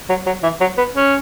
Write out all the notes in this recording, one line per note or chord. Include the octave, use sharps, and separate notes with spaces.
F#3
F#3
E3
F#3
B3
C#4